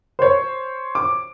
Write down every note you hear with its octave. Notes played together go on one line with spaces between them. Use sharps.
C5 C#5
D6